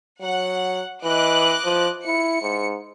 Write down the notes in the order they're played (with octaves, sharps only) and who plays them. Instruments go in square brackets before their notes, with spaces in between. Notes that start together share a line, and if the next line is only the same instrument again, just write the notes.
[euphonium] F#3 [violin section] F#5
[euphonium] E3 [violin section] D#5 D6 F#6
[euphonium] F3
[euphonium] E4 [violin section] C#7
[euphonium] G#2